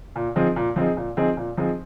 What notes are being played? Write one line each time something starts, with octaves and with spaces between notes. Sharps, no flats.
A#2
F3 C4 D#4 G#4
A#2
F3 C4 D#4 G#4
A#2
F3 C4 D#4 G#4
A#2
F3 C4 D#4 G#4